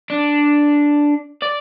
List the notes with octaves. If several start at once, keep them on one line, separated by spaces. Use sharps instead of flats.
D4
D5